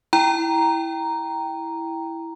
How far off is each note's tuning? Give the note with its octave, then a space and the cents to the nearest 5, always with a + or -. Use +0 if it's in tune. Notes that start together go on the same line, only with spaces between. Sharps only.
E4 +0 G5 +0 A#5 +0